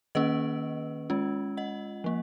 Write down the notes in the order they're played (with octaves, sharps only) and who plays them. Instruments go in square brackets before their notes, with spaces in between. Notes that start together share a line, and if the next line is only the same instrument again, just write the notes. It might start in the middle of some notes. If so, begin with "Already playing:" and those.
[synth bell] D#3 A#3 C#4 B4 D#5
G#3 C#4 F4
D#5 F#5
F3 A#3